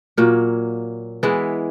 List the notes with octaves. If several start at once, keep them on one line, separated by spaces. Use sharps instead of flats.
A#2 F#3 A#3
E3 G#3 B3 E4